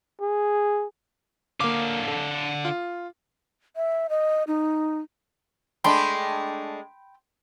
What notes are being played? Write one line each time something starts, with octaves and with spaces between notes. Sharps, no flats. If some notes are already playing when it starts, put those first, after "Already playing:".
G#4
D3 A#3 F5 D6
A4
F4
E5
D#5
D#4
G#3 A3 D4 G5 B5 C6